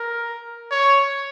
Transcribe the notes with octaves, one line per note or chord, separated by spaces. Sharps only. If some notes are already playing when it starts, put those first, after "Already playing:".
Already playing: A#4
C#5